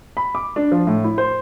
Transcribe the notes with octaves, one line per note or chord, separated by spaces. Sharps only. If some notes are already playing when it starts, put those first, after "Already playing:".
B5
D6
D4
F3
A2
E4
C5